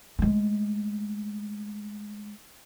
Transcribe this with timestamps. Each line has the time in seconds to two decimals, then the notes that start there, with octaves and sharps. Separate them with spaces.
0.19 G#3 A3